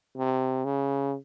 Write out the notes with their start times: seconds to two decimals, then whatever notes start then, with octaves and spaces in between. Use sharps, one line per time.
0.17 C3
0.65 C#3